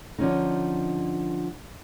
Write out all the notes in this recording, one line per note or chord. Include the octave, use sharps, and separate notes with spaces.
D3 F3 C#4 D#4